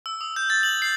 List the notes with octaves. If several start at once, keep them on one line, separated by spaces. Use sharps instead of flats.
E6
D#6
G6
A6
F#7
C7